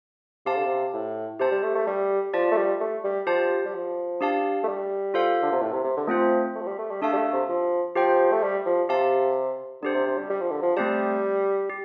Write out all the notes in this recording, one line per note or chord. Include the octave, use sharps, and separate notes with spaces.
C3 G4 F5 A5
D3
C3
A2
C3 G4 C5 A5
G3
A3
A3
G3
F3 F4 D5 A5
A3
G3
A3
G3
F3 G4 C5 A5
G3
F3
D4 G4 F5 A5
A3
G3
F4 A4 C5 F5
D3
C3
A2
C3
C3
D3
F3 A3 C4 F4 C5
A3
F3
G3
A3
G3
A3 D4 A4 F5 A5
G3
A3
C3
F3
F3 G4 C5 G5
A3
G3
F3
C3 G4 F5 A5
D3 D4 G4 C5
C3
C3
G3
G3
F3
D3
F3
G3 A3 C4 G4 C5 A5
G4